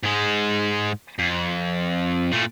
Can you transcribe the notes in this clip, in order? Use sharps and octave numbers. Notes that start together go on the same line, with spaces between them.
G#2 G#3
F2
A#2 A3